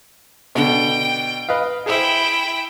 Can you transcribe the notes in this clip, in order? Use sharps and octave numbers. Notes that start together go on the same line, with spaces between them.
B2 D3 G5
B4 D#5 F5
E4 G#4 C5 E5 G5